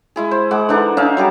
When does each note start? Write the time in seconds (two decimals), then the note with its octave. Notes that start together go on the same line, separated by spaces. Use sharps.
0.16 G#3 E4 G#4
0.31 C5
0.51 G#3 F#5 D6
0.69 D3 E3 D4 D#4
0.97 C#4 D#4 E5 F5
1.17 F#3 G3 G#4 A#4